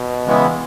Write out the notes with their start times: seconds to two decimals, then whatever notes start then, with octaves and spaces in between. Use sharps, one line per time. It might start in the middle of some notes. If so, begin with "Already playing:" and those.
Already playing: B2
0.26 C#3 E3 G#3 B3 E4